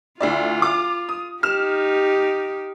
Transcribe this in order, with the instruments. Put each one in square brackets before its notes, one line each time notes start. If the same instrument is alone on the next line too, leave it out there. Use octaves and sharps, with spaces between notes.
[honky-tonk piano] D2 E4 D5 [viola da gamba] F4
[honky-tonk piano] D6
D#6
[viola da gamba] D#4 G4 [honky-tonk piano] F6 E7